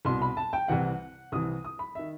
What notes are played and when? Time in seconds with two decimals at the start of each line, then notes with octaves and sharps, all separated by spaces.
0.05 C2 B2 C6
0.22 B5
0.37 A5
0.53 G5
0.68 C2 C3 E3 F#5
1.32 C2 C3 E3 D#6
1.65 D#6
1.79 B5
1.95 D#3 E5